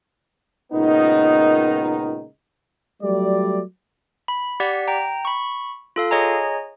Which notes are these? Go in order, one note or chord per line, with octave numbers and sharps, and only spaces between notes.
C#2 A#2 D#3 B3 D#4
F#3 G3 A3 D5
B5
G4 D5 F#5 B6
G5 A#5
B5 C#6
F4 A4 F5
G#4 C#5 D#5 G#5 A#5